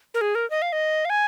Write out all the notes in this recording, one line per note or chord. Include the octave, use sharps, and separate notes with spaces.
A#4
G#4
A#4
D#5
F5
D#5
F5
G#5